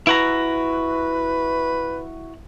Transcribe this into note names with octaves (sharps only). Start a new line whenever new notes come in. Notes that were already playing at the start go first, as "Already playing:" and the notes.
E4 F#4 B4 A#5